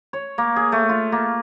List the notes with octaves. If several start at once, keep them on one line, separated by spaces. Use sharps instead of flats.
C#5
A#3
G#4
A3
F4
A#3